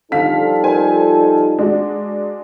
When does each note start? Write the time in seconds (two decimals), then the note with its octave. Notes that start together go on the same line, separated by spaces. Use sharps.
0.12 D3 F3 G3 D#4 F4 A4 F5 B6
0.64 A#4 C5 G#5
1.59 G#3 D4 F#4